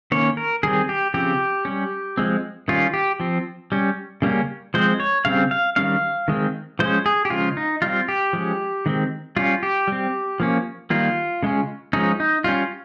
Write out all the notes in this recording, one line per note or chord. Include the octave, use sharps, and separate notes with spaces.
D#3 A#3 C#4 C#5
A#4
D#3 G3 C4 G#4
G4
C#3 F3 C4 G4
G3 C#4
F3 G#3 C4
D#3 G3 C#4 F4
G4
F3 C4
G3 C#4
C#3 G3 A#3 C#4
F3 G#3 C4 C5
C#5
C#3 G3 C4 F5
F5
D#3 G3 C#4 F5
D#3 G#3 C4
F3 G#3 C#4 C5
G#4
G4
C#3 F3 G#3 F4
D#4
G3 C4 F4
G4
F3 G#3 C#4
D#3 G#3 C4
G3 C#4 F4
G4
G3 C4
F3 A#3 C#4
D#3 G3 A#3 F4
C#3 G#3 C#4
F3 G#3 C#4 D#4
D#4
G3 C#4 F4